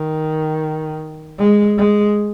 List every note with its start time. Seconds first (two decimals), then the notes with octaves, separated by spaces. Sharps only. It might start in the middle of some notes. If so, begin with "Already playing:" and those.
Already playing: D#3
1.39 G#3
1.78 G#3